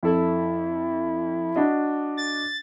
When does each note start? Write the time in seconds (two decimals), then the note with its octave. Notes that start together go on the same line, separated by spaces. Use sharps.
0.03 F2 E4 A4
1.56 D4 F#4 D#5
2.17 A6